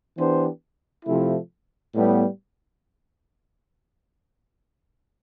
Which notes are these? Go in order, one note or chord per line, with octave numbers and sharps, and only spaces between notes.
E3 B3 D4 G4 C5
C3 F3 A3 E4
A2 G3 B3